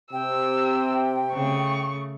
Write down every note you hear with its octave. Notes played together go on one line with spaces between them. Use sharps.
C3 G5 E6
C#3 A3 C#6